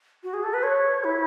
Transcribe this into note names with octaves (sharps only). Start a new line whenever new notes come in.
F#4
G#4
A4
B4
C#5
E4